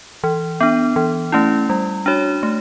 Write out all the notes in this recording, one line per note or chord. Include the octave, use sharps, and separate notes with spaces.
E3
B3 D4
E3
A3 C#4 E4
G3
D4 F#4 C#5
A3